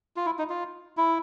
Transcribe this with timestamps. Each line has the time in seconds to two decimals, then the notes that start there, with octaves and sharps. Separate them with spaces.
0.16 F4
0.26 E4
0.38 D#4
0.50 F4
0.97 E4